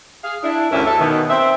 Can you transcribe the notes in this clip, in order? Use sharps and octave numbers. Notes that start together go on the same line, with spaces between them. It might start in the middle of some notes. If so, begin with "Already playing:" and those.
G#4 F5
D4 E4
D2 G2 E3 C#4 A#4 E5
A4 E5
B2 D#3
C4 E5